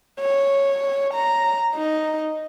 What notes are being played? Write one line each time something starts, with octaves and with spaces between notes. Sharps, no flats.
C#5
A#5
D#4